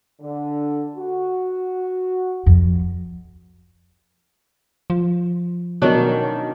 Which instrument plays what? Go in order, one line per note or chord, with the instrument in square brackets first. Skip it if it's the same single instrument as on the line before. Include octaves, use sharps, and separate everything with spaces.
[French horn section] D3
F#4
[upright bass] F2
[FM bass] F3
[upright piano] B2 F#3 [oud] D#3 C#4 D4